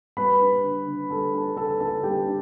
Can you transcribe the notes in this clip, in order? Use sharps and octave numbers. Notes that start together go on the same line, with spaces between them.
G3 B4 B5
D4
D3
D3
G3 A4 A5
D4 A4 A5
D3 A4 A5
D3 A4 A5
G3 G4 G5
D4